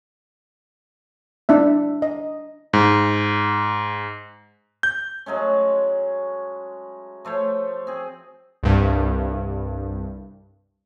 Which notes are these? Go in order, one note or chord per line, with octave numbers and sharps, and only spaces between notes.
D4 E4 E5
D#5
G#2
G6
F#3 G#3 A3 C#4
F3 A3 C5 C#5
C4 G#4
C2 G2